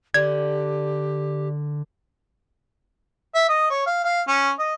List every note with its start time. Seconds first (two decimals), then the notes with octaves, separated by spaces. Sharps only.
0.14 D3 G4 D5 G#6
3.35 E5
3.49 D#5
3.70 C#5
3.87 F5
4.04 F5
4.28 C#4
4.59 D#5